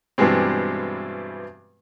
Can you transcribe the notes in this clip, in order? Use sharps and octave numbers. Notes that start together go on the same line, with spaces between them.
G2 B2 E3 G3 G#3 C4